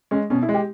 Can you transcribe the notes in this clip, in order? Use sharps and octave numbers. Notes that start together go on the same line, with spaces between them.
G#3 C#4
B2 C#4
E4
G#3
G4